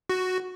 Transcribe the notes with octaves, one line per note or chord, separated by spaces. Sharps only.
F#4